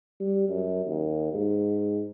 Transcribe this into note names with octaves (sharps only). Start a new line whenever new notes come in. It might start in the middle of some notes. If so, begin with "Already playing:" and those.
G3
F#2
D#2
G#2